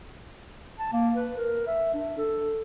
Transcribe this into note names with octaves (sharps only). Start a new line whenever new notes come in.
A5
A#3
B4
A#4
E5
D4
A4